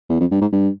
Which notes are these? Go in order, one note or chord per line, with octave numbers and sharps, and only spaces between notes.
E2
F2
G2
G#2
G2